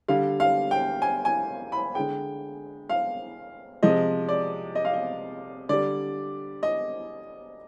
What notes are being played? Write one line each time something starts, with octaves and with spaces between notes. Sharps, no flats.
D3 G3 F5
F5
G5
G#5
G#5
B5
D3 G#3 G5
F5
C3 F3 G#3 D#5
D5
D#5
F5
D#5
D3 G3 D5
D#5